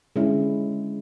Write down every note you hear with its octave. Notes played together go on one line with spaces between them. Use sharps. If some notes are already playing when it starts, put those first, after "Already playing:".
D3 G#3 C#4 E4